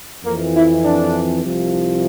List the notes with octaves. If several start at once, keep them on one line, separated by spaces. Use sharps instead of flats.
F2 E3 A#3
E4
D4
C2 C3 F3